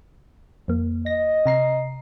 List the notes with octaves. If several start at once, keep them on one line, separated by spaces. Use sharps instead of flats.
F2 A#3
D#5 A#6
C3 A#5 C7